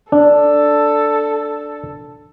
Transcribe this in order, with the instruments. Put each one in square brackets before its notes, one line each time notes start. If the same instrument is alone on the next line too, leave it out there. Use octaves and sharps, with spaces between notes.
[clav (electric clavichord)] D4 [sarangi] A4